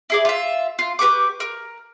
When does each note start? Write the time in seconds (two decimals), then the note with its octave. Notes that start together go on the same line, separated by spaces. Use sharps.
0.10 E4 G#4 D5
0.25 F4 E5
0.79 F4
0.99 G4 B4 C#6 D6
1.40 A#4